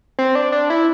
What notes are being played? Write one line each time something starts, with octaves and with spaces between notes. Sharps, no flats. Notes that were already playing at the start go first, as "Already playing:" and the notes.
C4
D4
D4
E4